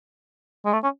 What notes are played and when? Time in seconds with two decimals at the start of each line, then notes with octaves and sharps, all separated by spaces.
0.66 G#3
0.73 A3
0.83 C#4